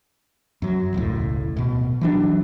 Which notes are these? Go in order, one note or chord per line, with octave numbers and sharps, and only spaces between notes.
F#2 F#3
E1 C#2 A2
D1 B2
E3 F#3 D4